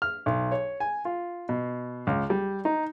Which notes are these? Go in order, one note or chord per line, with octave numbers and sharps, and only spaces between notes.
F6
B1
C#5
G#5
F4
B2
C#2
G3
D#4